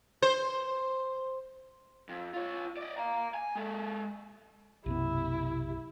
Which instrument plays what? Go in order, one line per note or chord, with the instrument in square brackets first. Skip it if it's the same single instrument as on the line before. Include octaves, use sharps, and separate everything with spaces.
[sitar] C5
[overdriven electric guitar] F2
F4 C#5
D5 D#5
F5 A#5
G#5
G#3 A4
[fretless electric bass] B1 F#2 B3 [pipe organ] C3 [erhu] E4